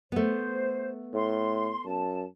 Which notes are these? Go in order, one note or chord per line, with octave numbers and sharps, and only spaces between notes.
A3 B3 C5
A2 C6
F#2 A5